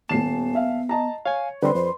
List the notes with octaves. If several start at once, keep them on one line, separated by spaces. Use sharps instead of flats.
D#1 D#2 B3 A5 C7 E7
E5 F5
D#5 A5 A#5
C#5 F5 G#5
D3 G3 C4 B4 C5 D5 C6
F2 C5